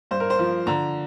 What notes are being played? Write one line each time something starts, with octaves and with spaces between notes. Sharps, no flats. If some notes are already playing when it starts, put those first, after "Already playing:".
G2 C5
A#4
C5
F3
D3 A#5